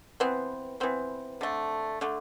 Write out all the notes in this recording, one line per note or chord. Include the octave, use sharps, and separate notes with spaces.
E3 B3 C4
E3 B3 C4
D3 A3
D3 A3